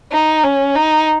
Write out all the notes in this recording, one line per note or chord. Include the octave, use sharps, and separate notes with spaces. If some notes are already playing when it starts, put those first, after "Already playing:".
D#4
C#4
D#4